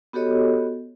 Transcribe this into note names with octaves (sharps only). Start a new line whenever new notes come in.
B3 F#4 G4 A4 C#5 D#5